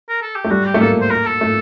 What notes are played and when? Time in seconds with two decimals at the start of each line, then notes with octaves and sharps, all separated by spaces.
0.09 A#4
0.22 A4
0.36 G4
0.44 A3
0.50 G3 F#4
0.66 G4
0.74 A3
0.80 A#3 A4
1.01 C5
1.11 A#4
1.26 A4
1.41 A3